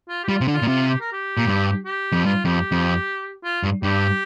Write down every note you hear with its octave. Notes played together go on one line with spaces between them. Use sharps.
F4
G4
G3 F4
C3
D3
F4
A#2
C3 F4
G4
A#4
G4
A#2
G2
G4
F2
G2 F4
F2 G4
F2
F4
G2
G2 G4